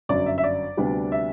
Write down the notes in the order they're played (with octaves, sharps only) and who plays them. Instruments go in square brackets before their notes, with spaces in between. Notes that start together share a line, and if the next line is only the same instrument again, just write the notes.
[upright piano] G1 F#2 F#3 D5
E5
E5
D5
D2 C3 G3 B3 D4
E5